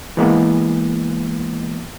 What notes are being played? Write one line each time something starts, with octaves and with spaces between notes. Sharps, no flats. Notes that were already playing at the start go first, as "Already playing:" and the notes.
E3 G#3 A#3 B3